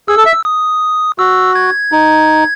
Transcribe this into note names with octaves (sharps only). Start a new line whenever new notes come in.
G#4 E6
A4
E5
D#6
F#4 E6
G#6
D#4